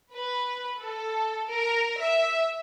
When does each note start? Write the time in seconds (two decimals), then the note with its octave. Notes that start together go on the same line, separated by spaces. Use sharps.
0.14 B4
0.82 A4
1.50 A#4
2.01 E5